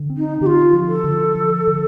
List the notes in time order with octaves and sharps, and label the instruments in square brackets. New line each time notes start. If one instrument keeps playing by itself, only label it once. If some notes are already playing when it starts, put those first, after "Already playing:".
Already playing: [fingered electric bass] D3
C4
[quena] D#4
[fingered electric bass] D3 [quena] G4
[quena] F4
[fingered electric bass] F3
[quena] A4
[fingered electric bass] D3
F3
D3